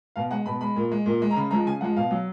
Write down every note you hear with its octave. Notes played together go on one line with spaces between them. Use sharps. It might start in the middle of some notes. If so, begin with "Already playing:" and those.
B2 F5
G#3 F#5
B2 B5
G#3 B5
A#2
G#3
A#2
G#3
A#5
C#3 B5
F3 G#3 A#5
C#3 G#5
F3 G#3 F#5
B2 F5
F#3